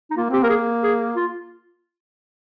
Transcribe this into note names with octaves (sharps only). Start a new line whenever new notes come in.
D#4
A#3 F4
C4 G4
A#3 A#4
G#4
G#4
F4